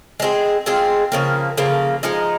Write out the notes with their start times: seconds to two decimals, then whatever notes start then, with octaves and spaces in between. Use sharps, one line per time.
0.20 G#3 C4 F4 G#4
0.66 G#3 C4 F4 G#4
1.12 C#3 F3 A#3
1.58 C#3 F3 A#3
2.03 F3 G#3 D#4